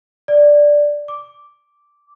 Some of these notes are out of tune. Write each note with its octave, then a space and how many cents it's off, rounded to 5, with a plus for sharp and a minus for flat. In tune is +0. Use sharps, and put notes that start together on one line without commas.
D5 +0
D6 -5